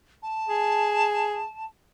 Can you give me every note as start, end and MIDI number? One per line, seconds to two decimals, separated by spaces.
0.22 1.65 81
0.49 1.42 68